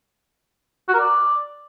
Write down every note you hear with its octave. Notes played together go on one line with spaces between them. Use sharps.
F#4
A#4
D5